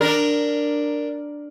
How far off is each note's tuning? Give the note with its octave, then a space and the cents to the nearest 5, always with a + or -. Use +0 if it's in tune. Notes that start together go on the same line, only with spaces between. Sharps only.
D4 +0 A#4 -5